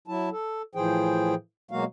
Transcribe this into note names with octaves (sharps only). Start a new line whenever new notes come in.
F#3 E4 A5
A4
A2 E3 F3 G#4 C5 G5
B2 F#3 G#3 A#3 F#4 F5